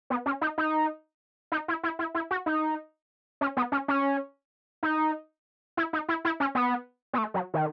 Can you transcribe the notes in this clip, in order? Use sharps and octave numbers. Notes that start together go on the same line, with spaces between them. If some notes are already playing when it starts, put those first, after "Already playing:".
B3
C#4
D#4
D#4
D#4
E4
E4
E4
E4
F#4
D#4
C#4
B3
C#4
C#4
D#4
E4
D#4
E4
E4
C#4
B3
B3
A3
F#3
D#3